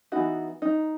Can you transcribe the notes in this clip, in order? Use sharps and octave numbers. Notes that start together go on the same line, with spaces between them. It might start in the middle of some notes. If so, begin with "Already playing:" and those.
E3 B3 D#4 F#4
D#4